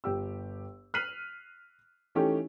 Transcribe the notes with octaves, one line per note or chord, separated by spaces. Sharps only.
G1 G4 E6
F6 F#6 B6 C7 D#7 F#7
E3 A3 C#4 D#4 G4 A4